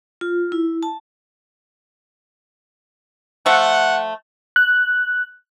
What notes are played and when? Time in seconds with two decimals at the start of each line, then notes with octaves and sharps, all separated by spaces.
0.21 F4
0.52 E4
0.83 A5
3.46 F3 A3 F#5
4.56 F#6